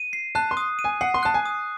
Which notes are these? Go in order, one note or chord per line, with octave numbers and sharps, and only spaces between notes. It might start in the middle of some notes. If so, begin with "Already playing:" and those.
Already playing: D#7
C7
A5 F#6
C6
D#6
D#7
G#5
F#5 C7
C6
A5 F#6
G#5
D#6